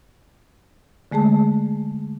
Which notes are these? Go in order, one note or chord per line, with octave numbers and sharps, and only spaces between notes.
D3 G#3 A3 G#4 A5